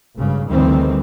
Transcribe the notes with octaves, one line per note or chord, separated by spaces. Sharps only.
G#1 G2 C#3
D2 D#3 E3 G3 C4